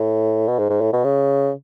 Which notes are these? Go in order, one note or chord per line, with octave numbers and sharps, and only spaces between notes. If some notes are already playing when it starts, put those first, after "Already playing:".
Already playing: A2
B2
G#2
G#2
A2
B2
C#3